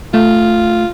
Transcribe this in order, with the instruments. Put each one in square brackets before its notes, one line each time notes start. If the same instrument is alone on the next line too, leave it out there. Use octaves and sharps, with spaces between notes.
[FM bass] A3 [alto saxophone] F4